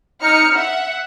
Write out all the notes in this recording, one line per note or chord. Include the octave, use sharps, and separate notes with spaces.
D#4 F6 C#7
E5 F#5